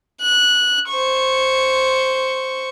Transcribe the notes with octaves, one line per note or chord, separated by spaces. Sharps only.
F#6
C5 C#6